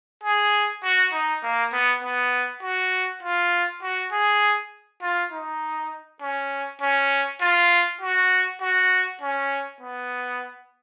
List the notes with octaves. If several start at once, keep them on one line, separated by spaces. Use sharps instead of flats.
G#4
F#4
D#4
A#3
B3
B3
F#4
F4
F#4
G#4
F4
D#4
C#4
C#4
F4
F#4
F#4
C#4
B3